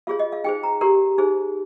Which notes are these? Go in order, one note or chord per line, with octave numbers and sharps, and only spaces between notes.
F4 G#4 C#5 F5
D#5
F5
D#4 G#4 C5 G5
A#5
G4 A#4 C#5 A#5
D#4 G#4 C5